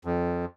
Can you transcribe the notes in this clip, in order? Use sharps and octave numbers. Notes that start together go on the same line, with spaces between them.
F2